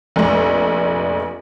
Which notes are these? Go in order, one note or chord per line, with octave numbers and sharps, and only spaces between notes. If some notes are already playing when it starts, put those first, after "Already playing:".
F1 A#1